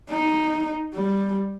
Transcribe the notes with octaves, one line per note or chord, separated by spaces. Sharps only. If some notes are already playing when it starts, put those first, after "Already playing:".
D#4
G3